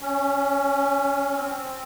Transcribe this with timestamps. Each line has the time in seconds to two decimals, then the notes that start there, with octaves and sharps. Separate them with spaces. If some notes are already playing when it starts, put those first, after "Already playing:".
0.01 C#4
1.34 C4